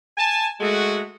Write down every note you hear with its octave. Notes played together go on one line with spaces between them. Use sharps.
G#5 A5
G#3 A3 F#4